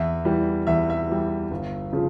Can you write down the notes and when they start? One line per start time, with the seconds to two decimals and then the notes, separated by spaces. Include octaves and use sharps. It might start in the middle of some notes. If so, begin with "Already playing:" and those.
Already playing: E2 E5
0.25 E3 G3
0.67 E2 E5
0.90 E5
1.09 E3 G3
1.51 G1
1.93 C#3 F3